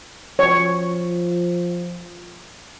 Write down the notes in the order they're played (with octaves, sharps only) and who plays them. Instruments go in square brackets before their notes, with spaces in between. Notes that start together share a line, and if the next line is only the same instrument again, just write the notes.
[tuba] F3 [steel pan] C#5